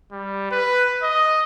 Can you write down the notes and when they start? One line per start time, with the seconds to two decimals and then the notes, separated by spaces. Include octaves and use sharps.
0.12 G3
0.51 B4
1.03 D#5